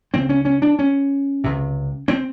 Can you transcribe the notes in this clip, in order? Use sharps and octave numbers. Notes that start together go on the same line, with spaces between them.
C#2 C#3 C4
C#4
C#4
D4
C#4
C#2 C3
C4